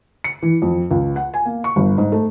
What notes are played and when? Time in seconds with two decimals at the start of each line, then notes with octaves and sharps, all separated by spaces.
0.24 C#7
0.43 E3
0.62 F2
0.91 C#2
1.16 F#5
1.34 G#5
1.45 A#3
1.64 C#6
1.76 G1
1.98 G#2
2.12 A3